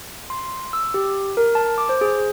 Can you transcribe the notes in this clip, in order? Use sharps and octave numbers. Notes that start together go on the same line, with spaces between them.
C6
E6
G4
A#4
A5
D6
C5
G#4